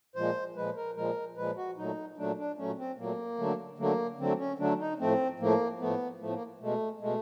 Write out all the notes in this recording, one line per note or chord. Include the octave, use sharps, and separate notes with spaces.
A#2 F3 G#3 C5
A#2 F3 G#3 B4
A#4
A#2 F3 G#3 A#4
A#2 F3 G#3 B4
F#4
A#2 F#3 A3 D#4
A#2 F#3 A3 D4
D4
A#2 F#3 A3 C#4
C4
A#2 F#3 A3 A#3
D3 F#3 A3
D3 F#3 A3 A#3
D3 F#3 A3 C4
C#4
D3 F#3 A3 D4
D#4
A2 F3 A3 C4
A2 F3 A3 A#3
A2 F3 A3 B3
A2 F3 A3
B3
A#3
B2 G#3 A3
B2 G#3 A3